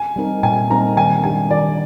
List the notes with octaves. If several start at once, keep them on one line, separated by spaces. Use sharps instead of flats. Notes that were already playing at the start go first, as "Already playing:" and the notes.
Already playing: G#5
G3 C4 D#4 A#4
A#2 G#5
G3 C4 D#4 A#4 A#5
D#3 G#5
G3 D4 G4 G#5
D#3 D5